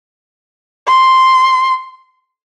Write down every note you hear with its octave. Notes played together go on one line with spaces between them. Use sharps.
C6